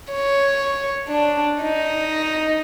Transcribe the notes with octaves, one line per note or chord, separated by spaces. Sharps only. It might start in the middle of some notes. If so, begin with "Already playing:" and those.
C#5
D4
D#4